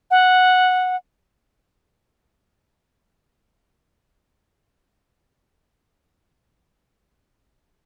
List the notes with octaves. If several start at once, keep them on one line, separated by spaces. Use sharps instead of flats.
F#5